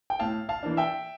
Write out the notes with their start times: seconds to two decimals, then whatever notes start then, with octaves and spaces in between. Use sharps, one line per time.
0.10 G5
0.19 A2 F5 A5
0.49 F5 A5
0.63 E3 A#3 D4
0.77 E5 G5